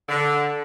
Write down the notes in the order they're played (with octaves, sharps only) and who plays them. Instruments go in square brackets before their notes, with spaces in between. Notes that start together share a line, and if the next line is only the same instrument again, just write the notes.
[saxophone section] D3